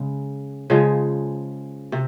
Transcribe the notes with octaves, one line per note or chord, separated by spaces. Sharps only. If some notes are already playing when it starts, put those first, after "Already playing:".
Already playing: C#3 G#3
C#3 F3 G#3
C3